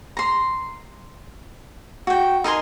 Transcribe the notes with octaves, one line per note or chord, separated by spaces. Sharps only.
A#5 C6
F#4 G5
D#4 A#4 G#5 C6